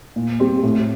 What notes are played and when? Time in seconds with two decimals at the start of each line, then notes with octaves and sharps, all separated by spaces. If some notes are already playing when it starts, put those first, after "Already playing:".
0.16 A#2
0.40 G3 C4 G4
0.63 A2